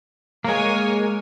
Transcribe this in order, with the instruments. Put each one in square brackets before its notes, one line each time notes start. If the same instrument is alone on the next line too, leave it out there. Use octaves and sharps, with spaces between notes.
[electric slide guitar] G#3 A#3 [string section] A#4 C#5 G#5